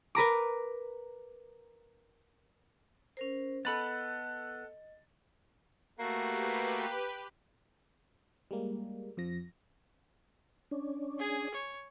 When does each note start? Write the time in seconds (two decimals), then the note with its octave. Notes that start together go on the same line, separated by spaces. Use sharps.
0.15 A#4 B4 A#5 D6
3.17 C#4 A#4 C5
3.65 B3 A4 D#5 B5 F#6 A6
5.99 A3 A#3 F#4 G4 B4
8.51 G3 G#3 A#3
9.17 F2 F3 A#6
10.71 C#4 D4
11.19 G#4 G#5
11.54 C#5